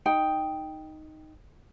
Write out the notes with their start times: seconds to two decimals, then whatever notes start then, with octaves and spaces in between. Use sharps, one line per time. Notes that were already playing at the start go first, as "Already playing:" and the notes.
0.06 D#4 G5